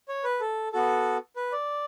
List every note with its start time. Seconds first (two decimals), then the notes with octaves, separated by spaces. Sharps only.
0.08 C#5
0.24 B4
0.40 A4
0.72 B3 F#4 A4
1.36 B4
1.52 D5